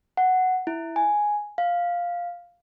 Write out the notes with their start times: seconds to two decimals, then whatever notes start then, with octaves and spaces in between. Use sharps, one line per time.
0.17 F#5
0.67 E4
0.96 G#5
1.58 F5